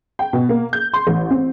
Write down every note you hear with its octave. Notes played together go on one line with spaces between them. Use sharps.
G5
B2
A#3
G6
C6
A1
C4